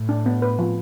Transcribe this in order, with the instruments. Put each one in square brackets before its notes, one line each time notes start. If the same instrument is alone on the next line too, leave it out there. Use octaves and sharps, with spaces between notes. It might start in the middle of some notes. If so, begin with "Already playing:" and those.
Already playing: [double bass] A2
[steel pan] D4
B3
B4
F3